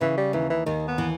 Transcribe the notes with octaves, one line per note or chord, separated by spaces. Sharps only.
C#3 E3
G3
D#2 E3
E3
D#2 D#3
B3
E3